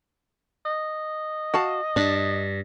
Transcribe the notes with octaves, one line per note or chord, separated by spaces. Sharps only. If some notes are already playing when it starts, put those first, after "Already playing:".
D#5
F#4 F5 A5
G2 D4